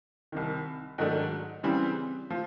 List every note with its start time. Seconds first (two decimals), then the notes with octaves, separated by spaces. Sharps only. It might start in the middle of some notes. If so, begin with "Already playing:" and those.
0.32 C2 C3 D#3
0.98 G#2 D#3 F#3 A3 D4
1.63 C#3 E3 G3 C4
2.30 F3